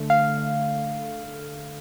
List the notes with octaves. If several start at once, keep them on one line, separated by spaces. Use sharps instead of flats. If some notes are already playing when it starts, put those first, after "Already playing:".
Already playing: D3 A3
F5